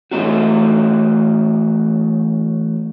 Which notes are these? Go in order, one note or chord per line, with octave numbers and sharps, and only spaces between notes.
E3 A3 C#4 F#4